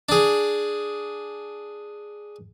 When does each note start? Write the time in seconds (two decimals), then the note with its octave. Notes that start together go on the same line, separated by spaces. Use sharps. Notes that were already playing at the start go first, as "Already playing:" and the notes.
0.09 D4 G#4